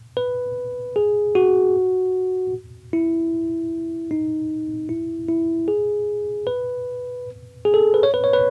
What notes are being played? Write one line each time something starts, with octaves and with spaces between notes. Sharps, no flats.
B4
G#4
F#4
E4
D#4
E4
E4
G#4
B4
G#4
A4
B4
C#5
B4
C#5
B4